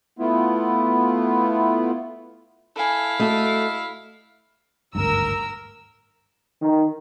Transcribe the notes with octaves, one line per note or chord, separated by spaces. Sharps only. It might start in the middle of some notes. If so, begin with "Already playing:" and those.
A3 B3 E4 F4
E4 A4 F5 G#5
A3 F#4 A4 D#5 E5
G#1 D2 G2 A#4 E6
D#3